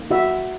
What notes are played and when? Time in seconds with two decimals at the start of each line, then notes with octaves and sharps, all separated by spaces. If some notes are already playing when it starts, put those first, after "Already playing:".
Already playing: A#3
0.11 F#4 E5